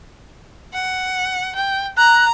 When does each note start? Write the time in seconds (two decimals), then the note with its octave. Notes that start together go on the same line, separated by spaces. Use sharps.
0.73 F#5
1.55 G5
1.97 A#5 F#6